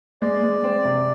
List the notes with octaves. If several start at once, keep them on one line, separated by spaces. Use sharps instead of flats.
G#3 D5
G#3
C4
C3